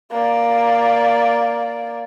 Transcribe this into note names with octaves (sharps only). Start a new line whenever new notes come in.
A#3 D5